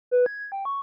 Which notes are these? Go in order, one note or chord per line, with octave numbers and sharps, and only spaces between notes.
B4
G#6
G5
C#6